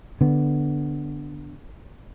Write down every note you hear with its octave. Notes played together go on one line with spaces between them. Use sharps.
D3 B3